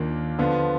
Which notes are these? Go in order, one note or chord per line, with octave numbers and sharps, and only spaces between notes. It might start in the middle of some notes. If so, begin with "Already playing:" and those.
Already playing: D#2 D#3 A#3 D4 F4
D3 F3 B3 F4